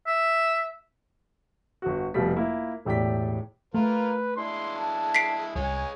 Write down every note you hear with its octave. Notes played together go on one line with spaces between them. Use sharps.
E5
G1 F#4
F1 B2 F3 G3 B6
A#3 E4 F4
E1 A2 G4 D5 G5 B6
A3 F4 A#4 B4
G#3 D4 E4 C6
A5
B6 C7 D7
C2 G#3 C#5 G#5